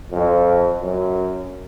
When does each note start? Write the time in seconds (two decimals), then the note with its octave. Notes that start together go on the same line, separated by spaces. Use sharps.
0.11 F2
0.81 F#2